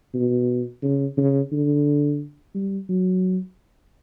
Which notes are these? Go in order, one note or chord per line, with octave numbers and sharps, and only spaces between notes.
B2
C#3
C#3
D3
G3
F#3